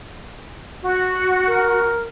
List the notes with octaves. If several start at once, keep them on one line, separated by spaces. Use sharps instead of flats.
F#4
A#4